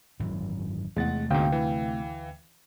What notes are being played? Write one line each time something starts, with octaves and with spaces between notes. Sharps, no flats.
G#1 F#2 E3
E2 C3 G#3 A3 F#5 A6
D2 G#2 B2 F5 G5
E3